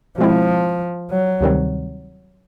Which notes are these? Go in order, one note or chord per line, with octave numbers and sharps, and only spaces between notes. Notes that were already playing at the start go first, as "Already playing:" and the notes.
B2 F3 G#3 C4 E4
F#3
D2 C3 D#3 G3 C4